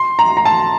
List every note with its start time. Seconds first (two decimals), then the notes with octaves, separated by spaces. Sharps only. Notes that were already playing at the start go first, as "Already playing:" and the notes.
Already playing: C6
0.19 A#5
0.37 A#5
0.45 A5